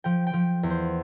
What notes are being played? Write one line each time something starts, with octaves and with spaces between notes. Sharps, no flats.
F3 G5
G5
F3
E2
C5